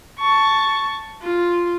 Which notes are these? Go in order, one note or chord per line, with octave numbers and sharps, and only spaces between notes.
A5 C#6
F4